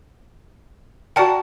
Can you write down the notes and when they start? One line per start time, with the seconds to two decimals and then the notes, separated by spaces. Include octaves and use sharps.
1.16 F#4 A#4 D5 F#5 G5 A5